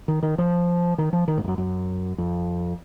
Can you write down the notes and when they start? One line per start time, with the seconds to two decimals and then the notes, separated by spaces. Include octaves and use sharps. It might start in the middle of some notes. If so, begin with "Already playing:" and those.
0.08 D#3
0.23 D#3
0.38 F3
0.98 D#3
1.13 F3
1.28 D#3
1.38 G#2
1.44 F2
1.48 F#2
1.58 F#2
2.18 F2